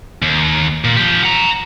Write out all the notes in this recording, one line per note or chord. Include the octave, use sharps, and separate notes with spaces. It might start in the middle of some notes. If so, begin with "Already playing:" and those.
D#2
A#2
F3 G4
F#5 A#5